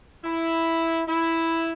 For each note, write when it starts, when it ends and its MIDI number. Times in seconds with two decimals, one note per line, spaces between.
0.23 1.02 64
1.07 1.71 64